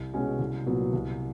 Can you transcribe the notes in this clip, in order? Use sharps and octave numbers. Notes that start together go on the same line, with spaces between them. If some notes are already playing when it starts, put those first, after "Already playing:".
Already playing: C2
B2 G#3 C#4 F#4
C2
A#2 F#3 B3
C2